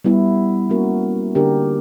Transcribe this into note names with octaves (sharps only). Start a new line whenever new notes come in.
G3 B3 E4
A#3 C#4 F#4 A#4
D3 A#3 D4 G4 A#4